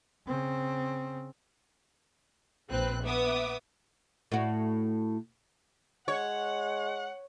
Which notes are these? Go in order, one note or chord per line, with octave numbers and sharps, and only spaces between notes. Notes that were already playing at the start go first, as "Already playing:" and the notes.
C#3 C4
A#1 C4 B4 F#6
B3 E5 D6 D#6
A2 F#4
G#3 C#5 F#5